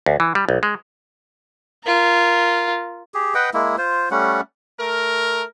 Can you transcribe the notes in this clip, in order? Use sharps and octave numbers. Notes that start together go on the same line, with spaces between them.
D2
E3
G3
B1
G#3
F4 A#4
G4 G#4
B4 D#5 F#5 G5
G#3 A#3 E4
F4 C5
G3 A3 C#4 F#5
A3 A#4